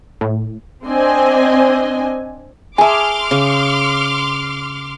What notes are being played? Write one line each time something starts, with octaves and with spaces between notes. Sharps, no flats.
A2
C4 D4 D#5 G#5
G#4 E5 G#5 A5 C6 D6 F6
C#3